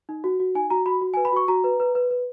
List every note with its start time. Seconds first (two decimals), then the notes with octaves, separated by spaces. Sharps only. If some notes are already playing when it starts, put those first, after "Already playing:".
0.09 D#4
0.24 F#4
0.40 F#4
0.55 D#4 G#5
0.70 F#4 A#5
0.86 F#4 B5
1.01 F#4
1.14 G#5
1.17 B4
1.25 B5
1.32 F#4 C#6
1.48 F#4 A#5
1.64 B4
1.80 B4
1.95 B4
2.11 B4